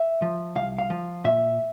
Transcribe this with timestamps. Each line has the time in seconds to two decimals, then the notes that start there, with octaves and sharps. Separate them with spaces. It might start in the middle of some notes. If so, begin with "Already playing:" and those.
Already playing: E5
0.22 F3
0.55 C2 F5
0.78 F5
0.90 F3
1.24 A#2 E5